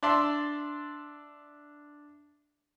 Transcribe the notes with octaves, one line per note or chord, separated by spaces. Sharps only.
D4 D5 E5 A5 C6